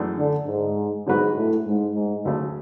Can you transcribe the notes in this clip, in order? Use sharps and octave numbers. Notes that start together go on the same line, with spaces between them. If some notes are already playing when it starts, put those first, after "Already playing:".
Already playing: F#2 E3 A3 D4 G#4
D3
G#2
G#2 D3 F#3 B3 F#4 B4
A2
G#2
G#2
D2 C#3 F#3 A3